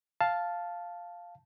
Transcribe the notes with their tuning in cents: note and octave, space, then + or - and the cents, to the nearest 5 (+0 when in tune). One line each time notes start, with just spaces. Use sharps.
F5 +0 A5 -5